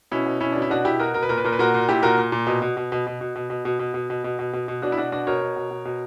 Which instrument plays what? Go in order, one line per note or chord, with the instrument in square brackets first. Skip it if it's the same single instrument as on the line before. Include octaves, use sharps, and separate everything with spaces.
[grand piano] B2 C#4 E4
B2
B2 C#4 E4
B2 D4
E4
B2 D4 F#4
B2 E4 G4
B2 F#4 A#4
B2 A#4
B4
A#2 A#4
B4
A#2 A#4
B4
A#2 F#4 A#4
A#2
A#2 E4 G4
A#2 F#4 A#4
A#2
A#2
B2
B2
B2
B2
B2
B2
B2
B2
B2
B2
B2
B2
B2
B2
B2
B2
B2 D4 F#4
E4
B2 D4 F#4
B2 D4 F#4
B2 A#4 C#5
B2
B2
B2
B2